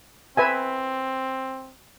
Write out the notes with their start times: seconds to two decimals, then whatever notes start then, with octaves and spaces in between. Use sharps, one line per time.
0.37 C4 B4 E5 G#5